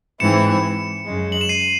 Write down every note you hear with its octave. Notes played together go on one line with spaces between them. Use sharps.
G#2 E3 C4 E4 C#7 E7
F#2 C#3 G#3
F#7
E7
C7 D#7